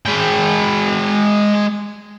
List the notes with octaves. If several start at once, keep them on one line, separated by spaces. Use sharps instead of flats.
G#3 G5